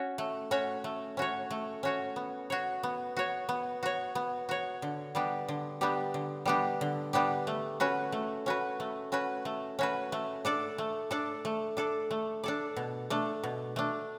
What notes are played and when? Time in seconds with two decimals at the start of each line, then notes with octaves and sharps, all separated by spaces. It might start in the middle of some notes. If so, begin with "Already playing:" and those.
Already playing: C#4 F#4 C#5
0.18 A3
0.51 C#4 F#4 C#5
0.84 A3
1.17 C#4 F#4 C#5
1.51 A3
1.83 C#4 F#4 C#5
2.16 B3
2.50 F#4 C#5
2.83 B3
3.17 F#4 C#5
3.49 B3
3.83 F#4 C#5
4.15 B3
4.49 F#4 C#5
4.82 D3
5.15 G3 B3 D4 G4
5.48 D3
5.81 G3 B3 D4 G4
6.14 D3
6.46 G3 B3 D4 G4
6.81 D3
7.13 G3 B3 D4 G4
7.47 A3
7.80 C#4 F#4 B4
8.12 A3
8.46 C#4 F#4 B4
8.80 A3
9.12 C#4 F#4 B4
9.45 A3
9.79 C#4 F#4 B4
10.12 A3
10.45 D4 A4 D5
10.78 A3
11.11 D4 A4 D5
11.45 A3
11.77 D4 A4 D5
12.11 A3
12.44 D4 A4 D5
12.77 B2
13.10 A3 D4
13.44 B2
13.76 A3 D4